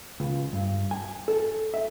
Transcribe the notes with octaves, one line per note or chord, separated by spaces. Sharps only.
C#2
G2
G#5
A4
E5